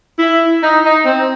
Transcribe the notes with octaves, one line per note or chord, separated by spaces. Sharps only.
E4
D#4
D#4
C4